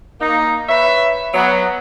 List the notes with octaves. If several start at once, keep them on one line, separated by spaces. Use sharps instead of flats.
A#3 D#4
B4 C#5 E5
F#3 B3